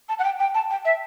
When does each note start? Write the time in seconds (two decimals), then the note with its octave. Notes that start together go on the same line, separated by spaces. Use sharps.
0.09 A5
0.19 F#5
0.24 G5
0.40 G5
0.54 A5
0.70 G5
0.85 E5